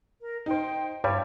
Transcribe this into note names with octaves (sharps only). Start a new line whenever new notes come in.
A#4
D#4 C5 G5
G2 G3 E4 C#5